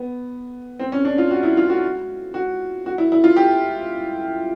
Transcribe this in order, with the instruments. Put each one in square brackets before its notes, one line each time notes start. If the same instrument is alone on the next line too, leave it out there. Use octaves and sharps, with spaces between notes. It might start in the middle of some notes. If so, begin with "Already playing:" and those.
Already playing: [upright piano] B3
C4
C#4
D4
F4
F#4
E4
F4
F#4
F#4
F#4
E4
E4
F4
G4